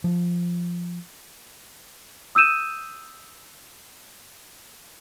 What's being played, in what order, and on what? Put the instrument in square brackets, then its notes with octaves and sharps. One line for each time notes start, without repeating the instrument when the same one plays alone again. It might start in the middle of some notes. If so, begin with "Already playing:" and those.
[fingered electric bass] F3
[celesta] D#6 E6 G6 D#7 E7